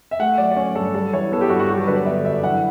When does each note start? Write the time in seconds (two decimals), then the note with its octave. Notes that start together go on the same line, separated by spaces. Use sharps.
0.11 E5
0.19 A3 F#5
0.38 F#3 D5
0.52 D5
0.56 C#4 C#5
0.75 G2 A4
0.94 G3 A4
1.13 E3 C#5
1.32 B3 A4
1.41 G4
1.49 G2 F#4
1.60 F#4
1.68 F#3 G4
1.77 A4
1.87 D3 B4
1.96 D5
2.05 B3 E5
2.25 F#2 E5
2.43 E3 F#5